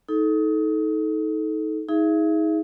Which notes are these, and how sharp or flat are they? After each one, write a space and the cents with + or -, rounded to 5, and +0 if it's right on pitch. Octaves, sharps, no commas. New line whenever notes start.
D#4 +25 A4 -20
D#4 +35 G#4 +0 E5 +40